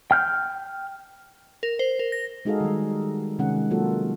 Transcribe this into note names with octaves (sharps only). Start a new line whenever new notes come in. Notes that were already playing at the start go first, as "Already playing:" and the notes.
G5 F6 G6
A#4
C5
A#4
A#6
G#3 D#4 F#4 G#4 A4 F5
D#3 G3
C3 D#3 G#3 C#4 F#5
F#3 A#3 F4 F#4 A4